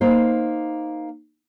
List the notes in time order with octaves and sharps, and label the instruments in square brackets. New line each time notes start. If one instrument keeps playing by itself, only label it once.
[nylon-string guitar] A#3 D#4 C5